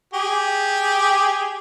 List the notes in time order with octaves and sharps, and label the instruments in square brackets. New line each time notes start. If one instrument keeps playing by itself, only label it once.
[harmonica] G4 G#4